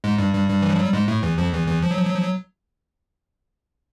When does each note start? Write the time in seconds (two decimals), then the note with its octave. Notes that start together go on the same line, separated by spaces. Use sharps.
0.04 G#2 G#3
0.18 G2 G3
0.33 G2 G3
0.48 G2 G3
0.62 E3
0.70 F3
0.78 F#3
0.85 G3
0.93 G#2 G#3
1.08 A2 A3
1.23 E2 E3
1.38 F2 F3
1.53 E2 E3
1.67 E2 E3
1.83 F3
1.91 F#3
1.98 F3
2.06 F#3
2.14 F3
2.22 F#3